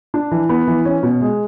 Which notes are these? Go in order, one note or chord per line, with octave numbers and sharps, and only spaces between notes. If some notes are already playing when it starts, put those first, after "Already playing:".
D4
E3
B3
E3
C#4
B2
G#3